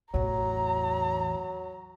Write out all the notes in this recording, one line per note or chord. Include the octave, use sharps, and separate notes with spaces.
A1 E2 F#3 A#5